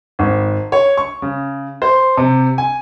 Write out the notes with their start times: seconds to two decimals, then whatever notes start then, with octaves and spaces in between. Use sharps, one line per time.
0.19 G#1
0.72 C#5
0.98 C#6
1.22 C#3
1.82 C5
2.17 C3
2.58 G#5